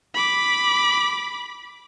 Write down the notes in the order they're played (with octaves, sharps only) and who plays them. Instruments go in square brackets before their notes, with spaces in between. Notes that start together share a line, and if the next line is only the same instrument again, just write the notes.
[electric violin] B5 D6